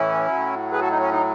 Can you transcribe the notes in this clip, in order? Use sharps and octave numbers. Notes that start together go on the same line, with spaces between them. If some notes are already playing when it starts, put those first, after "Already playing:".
Already playing: A2 E3 C#4 E4
A2 F#3
G#4 B4
F#4 A4
D#4
C#4
D#4